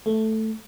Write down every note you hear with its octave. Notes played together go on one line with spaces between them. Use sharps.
A3